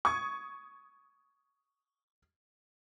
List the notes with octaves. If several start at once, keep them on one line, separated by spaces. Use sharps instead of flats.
C#6 D#6 G#6